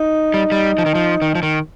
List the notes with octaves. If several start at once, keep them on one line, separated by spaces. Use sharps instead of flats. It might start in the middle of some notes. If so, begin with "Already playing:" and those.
Already playing: D#4
G3
G3
F3
D#3
F3
D#3
F3
D#3